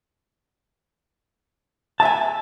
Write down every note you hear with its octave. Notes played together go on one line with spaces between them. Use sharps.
E5 G#5 A5